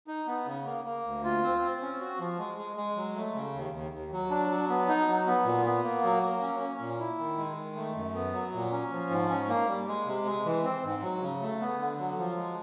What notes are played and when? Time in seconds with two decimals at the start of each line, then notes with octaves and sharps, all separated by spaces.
0.07 D#4
0.27 B3
0.46 C#3
0.65 A#3
0.85 A#3
1.04 D2
1.23 F4
1.42 C4
1.61 C4
1.81 C#4
2.00 F#4
2.19 F3
2.38 G#3
2.58 G#3
2.76 G#3
2.96 F#3
3.15 A3
3.35 C#3
3.54 D#2
3.72 D#2
3.91 D#2
4.12 F#3
4.30 D4
4.50 F#3
4.68 B3
4.88 D#4
5.08 F#3
5.26 B3
5.45 A#2
5.65 B3
5.83 A#3
6.03 F#3
6.23 A#3
6.41 C#4
6.60 C#4
6.80 A#2
6.99 E4
7.18 D#3
7.38 G#3
7.56 D#3
7.76 A3
7.95 F#2
8.14 B3
8.33 F#3
8.53 A#2
8.71 C#4
8.91 F3
9.10 G#2
9.29 C#4
9.49 A#3
9.67 G3
9.87 G#3
10.06 C3
10.25 G#3
10.45 E3
10.63 C4
10.83 G#2
11.02 F#3
11.21 C#3
11.41 A3
11.60 B3
11.78 D3
11.98 F#3
12.18 F3
12.36 G#3